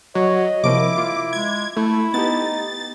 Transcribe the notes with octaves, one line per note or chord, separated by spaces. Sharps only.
F#3 C#5 D#5
C3 F3 A#3 E4 D6
F4
G#3 G#6
A3 E4
B3 D#4 G4 A6